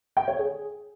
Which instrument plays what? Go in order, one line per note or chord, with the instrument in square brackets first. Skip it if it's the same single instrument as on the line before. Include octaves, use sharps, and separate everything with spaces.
[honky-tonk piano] G5
C#5
G#4